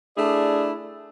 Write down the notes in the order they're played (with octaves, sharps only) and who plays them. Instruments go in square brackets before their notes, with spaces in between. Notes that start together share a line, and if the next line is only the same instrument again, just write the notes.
[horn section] A3 D4 E4 G#4 D5